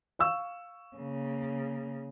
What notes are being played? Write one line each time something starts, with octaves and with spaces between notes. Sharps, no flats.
F5 C#6 E6
C#3 A#3